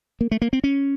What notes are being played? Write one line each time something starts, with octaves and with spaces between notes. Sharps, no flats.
A#3
A3
A#3
C4
C#4